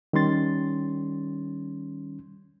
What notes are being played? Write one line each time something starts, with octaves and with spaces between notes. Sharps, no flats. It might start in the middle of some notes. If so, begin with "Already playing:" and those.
D#3 G3 C#4 C6 A6